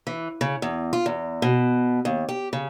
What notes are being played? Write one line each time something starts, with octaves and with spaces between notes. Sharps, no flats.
E3
C#3
E2
F4
E2
B2
D#2
G4
C#3